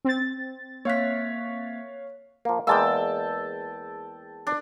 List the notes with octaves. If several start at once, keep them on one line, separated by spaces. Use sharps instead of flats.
C4 A6
A#3 C#5 F5 F#6 B6
F3 A#3
E2 G#3 A#3 G5 A5 E6
D4